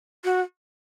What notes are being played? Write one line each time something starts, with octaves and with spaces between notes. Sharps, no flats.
F#4